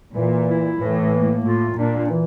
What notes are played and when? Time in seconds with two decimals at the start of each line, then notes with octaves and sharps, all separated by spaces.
0.15 A#2 E3
0.48 E4
0.80 A2 E3
1.12 A#3
1.44 A2 F4
1.77 A#2 D4
2.10 E3